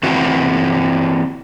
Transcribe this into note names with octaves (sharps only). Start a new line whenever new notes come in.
E3 C4 F#4